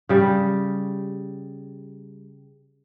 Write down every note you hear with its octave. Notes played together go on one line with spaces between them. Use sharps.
C#3 G3